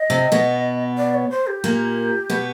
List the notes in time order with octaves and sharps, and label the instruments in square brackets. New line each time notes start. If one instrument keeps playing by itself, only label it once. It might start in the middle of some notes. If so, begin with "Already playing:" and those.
Already playing: [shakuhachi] D#5
[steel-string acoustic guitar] C3 C4
B2 B3
[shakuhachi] D5
C#5
C5
G4
[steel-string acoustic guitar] A#2 A#3
B2 B3